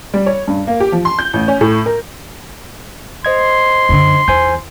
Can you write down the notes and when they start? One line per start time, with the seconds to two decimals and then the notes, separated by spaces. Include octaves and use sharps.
0.14 G3
0.26 C#5
0.48 G2
0.67 A#3
0.80 G4
0.92 F3
1.05 C6
1.19 G6
1.33 A1
1.48 C#4
1.61 A2
1.86 A#4
3.25 C5 D#5 C6 G#6
3.89 F#2 D3
4.28 E2 C5 G#5 G6